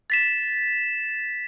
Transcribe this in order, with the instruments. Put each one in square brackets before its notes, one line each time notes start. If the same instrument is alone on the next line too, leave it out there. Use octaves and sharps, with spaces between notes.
[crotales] A6 B6 E7